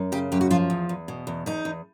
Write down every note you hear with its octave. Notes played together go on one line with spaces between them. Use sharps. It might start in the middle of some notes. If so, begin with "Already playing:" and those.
Already playing: F#2
C#3 G4
F#2 G4
F#4
F3 F4
E2
E2
B2
E2
E2 D#4
E2